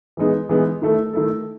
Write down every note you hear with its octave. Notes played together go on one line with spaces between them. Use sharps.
E3 G#3 B3 D#4 G#4
E3 G#3 B3 D#4 G#4
D#3 A3 E4 A4
D#3 A3 E4 A4